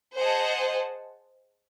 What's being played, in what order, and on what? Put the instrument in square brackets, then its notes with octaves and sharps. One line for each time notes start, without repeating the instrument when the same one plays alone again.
[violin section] G#4 C5 D#5 F#5 A5